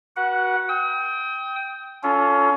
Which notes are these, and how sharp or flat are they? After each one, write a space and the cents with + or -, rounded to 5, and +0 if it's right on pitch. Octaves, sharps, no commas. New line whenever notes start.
F#4 +10 B4 -40 F#5 +0
G5 +0 D#6 +40
C#4 +25 F4 +0 A4 +0